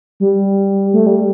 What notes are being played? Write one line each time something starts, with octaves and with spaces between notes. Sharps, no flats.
G3
A3
G3